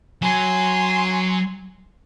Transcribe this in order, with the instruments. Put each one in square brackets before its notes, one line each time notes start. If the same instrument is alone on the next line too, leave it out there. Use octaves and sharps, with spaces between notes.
[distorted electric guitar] F#3 [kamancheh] G#5 C6